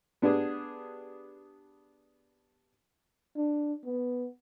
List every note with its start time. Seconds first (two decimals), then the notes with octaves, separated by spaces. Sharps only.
0.22 B3 D4 G4 G#4
3.36 D4
3.85 B3